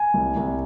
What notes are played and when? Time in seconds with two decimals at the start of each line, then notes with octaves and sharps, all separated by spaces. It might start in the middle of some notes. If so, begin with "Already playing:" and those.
Already playing: G#5
0.14 C2
0.37 C2